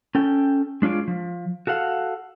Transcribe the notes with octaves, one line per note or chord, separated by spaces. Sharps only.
C#4 A4 G5
G#3 D4 F4 C#5 D5
F3
F#4 A4 F5 F#5